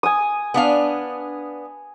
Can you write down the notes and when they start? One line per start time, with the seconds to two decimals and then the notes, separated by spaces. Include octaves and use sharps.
0.03 G#5 D#6
0.54 B3 D4 F5